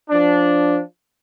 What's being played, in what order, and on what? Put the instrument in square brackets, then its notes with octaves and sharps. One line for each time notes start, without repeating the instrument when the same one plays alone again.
[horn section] F3 D4